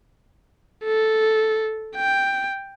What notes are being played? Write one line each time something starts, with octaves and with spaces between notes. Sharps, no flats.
A4
G5